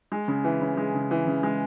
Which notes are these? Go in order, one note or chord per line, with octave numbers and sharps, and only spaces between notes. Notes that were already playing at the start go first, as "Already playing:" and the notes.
G#3
C#3
E3
C#3
G#3
C#3
E3
C#3
G#3